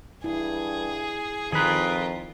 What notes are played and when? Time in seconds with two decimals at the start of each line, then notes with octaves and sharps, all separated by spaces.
0.24 G2 E4 G#4
1.53 F2 D#3 F4 G#4 A#4 B4